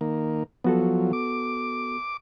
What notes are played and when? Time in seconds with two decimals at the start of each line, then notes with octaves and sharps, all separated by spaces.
0.01 D#3 A#3
0.64 F3 F#3 B3 F#4 A4
1.13 D6